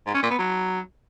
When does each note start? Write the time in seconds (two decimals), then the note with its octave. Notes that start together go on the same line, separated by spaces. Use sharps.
0.06 G#2
0.14 C#4
0.22 A#2
0.31 B3
0.39 F#3